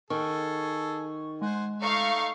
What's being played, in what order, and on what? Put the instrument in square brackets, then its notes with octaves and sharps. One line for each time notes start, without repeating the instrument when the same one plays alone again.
[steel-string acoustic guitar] D#3 [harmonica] G#4 A4 [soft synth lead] C#6
[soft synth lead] G#3 [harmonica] C5 F#5 G#5
[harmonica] A3 D#4 [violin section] F5 C#6